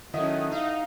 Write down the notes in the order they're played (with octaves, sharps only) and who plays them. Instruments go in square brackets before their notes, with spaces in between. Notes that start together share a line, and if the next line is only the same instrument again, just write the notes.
[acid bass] D#3 [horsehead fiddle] F#3 C#4 [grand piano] E4 D#5 [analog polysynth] A4 F#5 D#6
[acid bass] D#4 [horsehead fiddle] F5